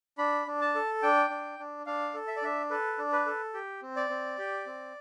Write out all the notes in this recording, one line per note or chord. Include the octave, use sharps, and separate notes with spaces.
D4 B5
D4
A5
A4
D4 G5
D4
D4
D4 F5
A4
E5
D5
D4 E5
A4 B4
D4
B4
A4
G4
C4
D5
C4
G4
C4